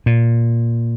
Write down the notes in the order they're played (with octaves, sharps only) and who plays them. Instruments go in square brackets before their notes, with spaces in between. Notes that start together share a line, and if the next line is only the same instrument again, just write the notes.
[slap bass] A#2